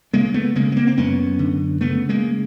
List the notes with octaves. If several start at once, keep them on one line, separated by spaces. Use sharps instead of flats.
C#3 G#3 A#3
A3 B3
C#3 G#3 A#3
B3
A#3 C4
C4
F#2 B3 C#4
D3
C#3 A3 B3
G#3 A#3